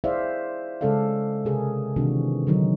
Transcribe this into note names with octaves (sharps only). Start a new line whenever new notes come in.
E4 G#4 C5 D5 E5 F5
C#3 G#3 C#4 A4 D5 F5
C3 G#4 A#4
C3 D#3 E3 C4 D4 F#4
D3 D#3 F#3 D#4